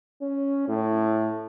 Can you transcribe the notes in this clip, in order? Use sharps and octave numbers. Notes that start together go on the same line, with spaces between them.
C#4
A2